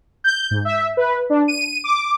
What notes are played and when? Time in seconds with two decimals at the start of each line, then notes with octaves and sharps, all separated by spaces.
0.24 G6
0.51 G#2
0.65 E5
0.97 B4
1.30 D4
1.48 D#7
1.84 D6